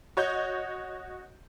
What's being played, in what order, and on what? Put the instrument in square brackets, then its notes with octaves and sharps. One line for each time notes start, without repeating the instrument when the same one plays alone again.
[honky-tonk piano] F#4 C#5 D#5 G6